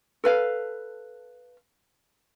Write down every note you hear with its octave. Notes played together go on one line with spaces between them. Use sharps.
A4 B4 F5